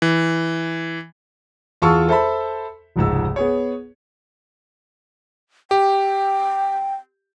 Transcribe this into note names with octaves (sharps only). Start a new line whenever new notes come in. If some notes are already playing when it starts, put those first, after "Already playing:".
E3
E2 F4 G#4 A5 C#6 E6
A4 C5 E5 A5 B5
F1 C#2 G#2 E6
B3 G#4 C#5
G4 G5